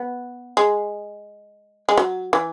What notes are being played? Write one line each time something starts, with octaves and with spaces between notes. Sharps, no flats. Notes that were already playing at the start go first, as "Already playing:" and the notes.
Already playing: B3
G#3
G#3
F#3
E3